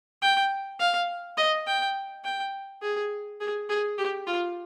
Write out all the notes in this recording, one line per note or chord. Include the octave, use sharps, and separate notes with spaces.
G5
F5
D#5
G5
G5
G#4
G#4
G#4
G4
F4